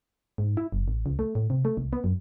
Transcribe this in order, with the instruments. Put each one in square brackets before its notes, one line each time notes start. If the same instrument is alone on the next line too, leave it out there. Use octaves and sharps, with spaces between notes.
[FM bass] G#2
E4
F#1
A1
C#2
A3
A2
C3
A3
C2
B3
F#2